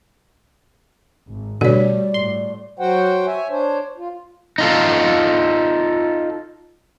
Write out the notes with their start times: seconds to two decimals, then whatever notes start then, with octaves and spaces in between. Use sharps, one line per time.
1.28 G#1
1.61 B2 D3 G3 A3 F#4 C#5 D5
2.14 A2 C6
2.79 F#3 F#4 C5 F#5 G5
3.26 C#5 E5 G#5
3.50 D4 C5 C#5
3.97 F4
4.58 D#4 F4 A4